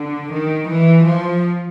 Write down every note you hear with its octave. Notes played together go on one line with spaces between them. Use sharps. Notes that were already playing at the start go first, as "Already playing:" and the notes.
Already playing: D3
D#3
E3
F3